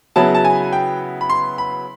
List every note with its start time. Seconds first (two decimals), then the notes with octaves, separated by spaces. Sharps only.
0.16 C#3 F#3 B3 E4 A5
0.35 A5
0.45 G#5
0.73 G5
1.21 B5
1.30 C6
1.58 B5